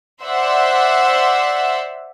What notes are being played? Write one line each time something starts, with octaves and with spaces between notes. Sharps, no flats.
C5 D5 E5 F#5 C6 E6